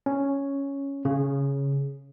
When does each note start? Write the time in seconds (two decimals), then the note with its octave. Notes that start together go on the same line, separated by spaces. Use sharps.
0.06 C#4
1.05 C#3